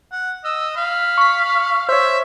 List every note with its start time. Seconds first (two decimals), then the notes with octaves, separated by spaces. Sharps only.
0.12 F#5
0.44 D#5 E6
0.76 F5 B5
1.17 C#6 B6
1.89 C5 C#5 E5